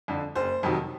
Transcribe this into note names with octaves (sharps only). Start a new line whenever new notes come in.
F2 D3
F#1 C5
F2 C3 D#3 F#3